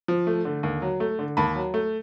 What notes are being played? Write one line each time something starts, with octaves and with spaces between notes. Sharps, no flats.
F3
A3
D3
D#2
F#3
A3
D3
D#2 A5 B5
F#3
A3